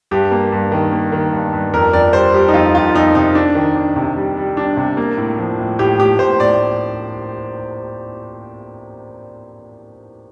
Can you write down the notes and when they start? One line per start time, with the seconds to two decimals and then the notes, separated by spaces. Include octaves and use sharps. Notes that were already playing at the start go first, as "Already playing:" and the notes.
0.11 G2 G4
0.31 A#3
0.52 G2
0.72 D#3
0.91 A#3
1.12 D#3
1.32 G2
1.53 G2
1.73 F2 A#4
1.93 F2 D5
2.13 G3 C5
2.34 G3 G4
2.48 D#4
2.54 F2 F4
2.74 F2 F4
2.94 F2 D#4
3.15 C3 D#4
3.35 D4
3.55 D#3
3.75 D4
3.96 C3
4.17 G3
4.37 G3
4.57 D4
4.77 C3
4.97 A#3
5.17 A2
5.38 F3
5.59 A2
5.79 A2 G4
5.99 A2 G4
6.19 A2 C5
6.40 A2 D5